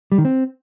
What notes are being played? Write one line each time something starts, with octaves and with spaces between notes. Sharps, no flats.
G3
D#3
C4